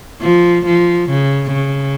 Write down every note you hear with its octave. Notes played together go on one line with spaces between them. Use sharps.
F3
F3
C#3
C#3